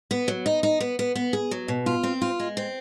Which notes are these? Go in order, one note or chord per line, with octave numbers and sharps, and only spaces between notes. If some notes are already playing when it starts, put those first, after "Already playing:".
B3
F#3
D#4
D#4
B3
B3
B3
G#4
F#3
B2
F4
C4
F4
G#3
C4